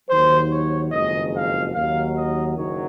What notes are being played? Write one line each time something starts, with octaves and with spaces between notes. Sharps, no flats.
D#2 D#3 F#3 C5
C#5
F#1 F2 D#3 G#3 D#5
F5
D#2 D#3 F#3 F5
D#5
F#1 F#2 D#3 F#3 C#5